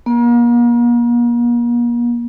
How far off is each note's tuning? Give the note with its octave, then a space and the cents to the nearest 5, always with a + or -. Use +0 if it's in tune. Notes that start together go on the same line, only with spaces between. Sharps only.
A#3 +40